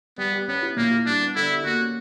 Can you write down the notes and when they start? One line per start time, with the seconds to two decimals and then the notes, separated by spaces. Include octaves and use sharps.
0.18 G3 B3
0.33 G4
0.48 B3 C#4
0.62 E4
0.77 A#2 A#3
0.91 E4
1.06 G3 D4
1.21 B3
1.35 D3 E4
1.50 G4
1.64 A#3 F#4
1.80 C#4